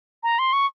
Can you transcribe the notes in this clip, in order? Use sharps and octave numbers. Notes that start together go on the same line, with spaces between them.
A#5
C6
C#6